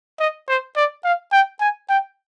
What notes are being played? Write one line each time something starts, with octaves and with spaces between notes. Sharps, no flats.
D#5
C5
D5
F5
G5
G#5
G5